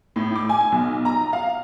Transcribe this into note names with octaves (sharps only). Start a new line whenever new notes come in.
A2
D6
G#5
B1
A#5
F5